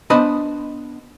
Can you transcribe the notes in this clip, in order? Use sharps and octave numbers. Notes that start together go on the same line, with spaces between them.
B3 D4 C5 D#5 B5